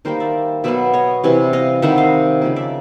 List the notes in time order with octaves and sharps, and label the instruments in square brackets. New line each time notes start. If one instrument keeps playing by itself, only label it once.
[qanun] D#3 G3 A#3 A#4 C5
D5 E5
B2 F#3 B3 D5 E5
C#5 D#5
C3 E3 G3
D#5 F5
C3 D#3 G3 E5 F#5
D#5 F5
C#3 F3 A#3
D5 E5